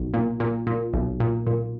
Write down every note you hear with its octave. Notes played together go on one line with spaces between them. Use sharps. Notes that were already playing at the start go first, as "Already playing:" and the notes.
Already playing: B1
A#2
A#2
A#2
B1
A#2
A#2